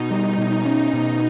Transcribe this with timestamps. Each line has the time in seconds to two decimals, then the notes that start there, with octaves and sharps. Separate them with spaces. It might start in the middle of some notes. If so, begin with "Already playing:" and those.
Already playing: B2 D#4
0.11 G3
0.38 B2
0.65 C#4
0.93 B2